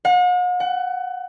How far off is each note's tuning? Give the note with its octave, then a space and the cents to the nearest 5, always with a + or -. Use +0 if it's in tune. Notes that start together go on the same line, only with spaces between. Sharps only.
F#5 -45
F#5 +25